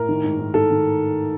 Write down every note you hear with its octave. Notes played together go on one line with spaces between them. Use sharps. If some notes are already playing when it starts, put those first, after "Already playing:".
Already playing: A2 A#4
D#3
G#2
G#2
G#2 A4
D#3